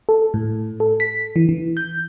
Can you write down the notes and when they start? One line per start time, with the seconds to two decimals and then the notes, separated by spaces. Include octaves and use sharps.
0.09 A4
0.34 A2
0.80 A4
1.00 B6
1.36 E3
1.49 E3
1.77 G6